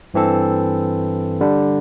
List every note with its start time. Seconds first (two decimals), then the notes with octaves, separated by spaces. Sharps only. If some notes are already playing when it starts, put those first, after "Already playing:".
0.14 G2 E3 C4 A4
1.41 D3 G3 D4